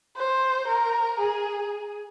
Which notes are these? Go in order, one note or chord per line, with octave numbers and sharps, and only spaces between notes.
C5
A#4
G#4